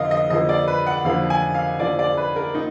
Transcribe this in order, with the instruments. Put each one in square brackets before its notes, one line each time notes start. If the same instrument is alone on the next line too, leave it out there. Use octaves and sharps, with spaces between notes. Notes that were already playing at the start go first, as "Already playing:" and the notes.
Already playing: [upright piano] F2 D3 A#3 D#5 F5
D#5
F2 D3 F3 A#3 D#5
D5
B4
F#5
F2 D3 F3 A#3 F5
G#5
F5
F2 D3 F3 A#3 D5
D5
B4
A#4
A#2 D#4